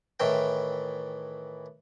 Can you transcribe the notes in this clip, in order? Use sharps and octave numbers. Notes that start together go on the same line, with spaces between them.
A2 D#3 E3 G5